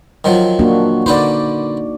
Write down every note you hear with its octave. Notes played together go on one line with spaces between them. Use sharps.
D#3 F3 F#3
A#3 D4 F#4
D3 D#4 B4 C5 D5